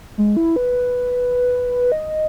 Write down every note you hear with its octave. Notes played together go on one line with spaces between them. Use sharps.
G#3
E4
B4
D#5